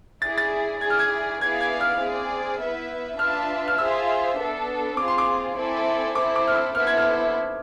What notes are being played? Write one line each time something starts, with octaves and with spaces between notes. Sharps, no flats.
E4 G#4 D5 A6
A6
E4 G#4 D5 G#6
F6
G#6
B3 E4 G#4 D5 F5 G#6
G#6
F6
C4 G#4 D5
B3 E4 B4 E5
D4 F4 B4 E5 A5 F6
F6
F4 G#4 C5 E5 E6
B3 D4 A4
C4 F4 G#4 D6
C6
D6
C4 E4 A4 D5 G#5
C4 E4 A4 C5 D6
D6
F6
E6
B3 E4 A4 C5 F6
G#6
F6